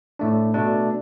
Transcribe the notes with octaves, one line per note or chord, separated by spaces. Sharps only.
A2 A3 D4
B2 A3 D4